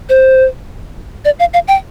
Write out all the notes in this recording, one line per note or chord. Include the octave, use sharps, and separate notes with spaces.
C5
D5
F5
F5
G5